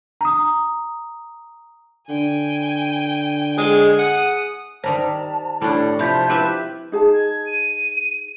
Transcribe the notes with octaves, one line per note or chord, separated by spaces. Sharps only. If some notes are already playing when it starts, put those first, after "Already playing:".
A#5 D#6
D3 G5 G#5
G#3 G#4
F#5 D#6
D#3 G3 C5 A5 A#5
A2 G3 D4
C3 F3 E5 B5 G6 B6
E4 G4 B4 E5
D#4 G#4 A5
G#6
D#7